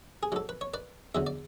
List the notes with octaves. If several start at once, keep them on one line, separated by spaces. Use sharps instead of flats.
G#4
G#2 F#3 A4
B4
C#5
B4 D5
E2 D3 F#3 E5
D5